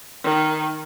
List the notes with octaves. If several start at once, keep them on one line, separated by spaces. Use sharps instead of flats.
D#3